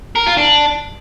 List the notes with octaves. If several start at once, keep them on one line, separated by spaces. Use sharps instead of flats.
A#4
F4
D4